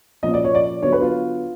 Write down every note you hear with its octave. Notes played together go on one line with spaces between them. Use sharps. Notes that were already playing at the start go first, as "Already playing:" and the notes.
A#2 F3 A#3 C#4 D#5
D5
C#5
D5
D3 F#3 B3 C#5
B4
F4